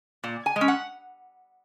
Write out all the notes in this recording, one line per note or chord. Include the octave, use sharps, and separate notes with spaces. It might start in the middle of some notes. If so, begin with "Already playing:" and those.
A#2
G#5
G#3
C#4
F#5